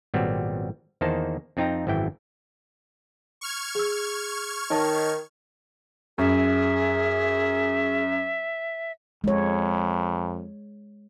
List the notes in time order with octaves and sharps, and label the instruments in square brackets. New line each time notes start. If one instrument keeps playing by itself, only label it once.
[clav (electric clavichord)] G#1 A#2 F#3 G3 B3 C4
E2 D#3 A#3 D#4 C5 A5
F2 C4 D#4 F4 G5 A#5
G#1 F#2 E3 E4 G5
[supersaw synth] C#6 F6 G#6
[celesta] G#4 E6
[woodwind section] D#3 [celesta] D#4 C#5 A5
[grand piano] F#2 [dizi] G#4 [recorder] E5
[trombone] F2 [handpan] G#3 C#5